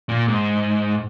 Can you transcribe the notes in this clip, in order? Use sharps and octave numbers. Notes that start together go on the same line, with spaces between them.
A#2
G#2